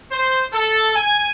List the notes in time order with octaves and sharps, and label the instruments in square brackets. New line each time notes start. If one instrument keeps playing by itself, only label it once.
[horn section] C5
A4
G#5